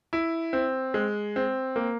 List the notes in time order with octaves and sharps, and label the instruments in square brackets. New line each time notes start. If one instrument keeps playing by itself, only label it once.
[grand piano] E4
C4
G#3
C4
A#3